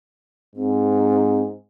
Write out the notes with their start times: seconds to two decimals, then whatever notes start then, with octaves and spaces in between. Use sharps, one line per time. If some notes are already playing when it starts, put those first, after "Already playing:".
0.56 G#2 C4